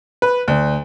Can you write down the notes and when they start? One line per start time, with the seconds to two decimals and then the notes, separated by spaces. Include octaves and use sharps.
0.22 B4
0.48 D2